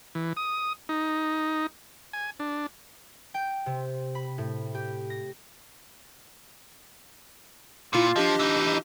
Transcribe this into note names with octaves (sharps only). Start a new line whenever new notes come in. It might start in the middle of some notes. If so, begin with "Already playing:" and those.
E3
D#6
D#4
G#5
D4
G5
C3
B5
A2
G4
A#6
A#2 E4 F4 F5 C#7
F3 D4 G4 D#5
E3 D#4